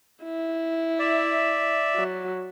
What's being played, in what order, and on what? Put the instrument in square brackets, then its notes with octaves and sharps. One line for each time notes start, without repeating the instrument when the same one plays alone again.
[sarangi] E4
[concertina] D5 E5
[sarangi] F#3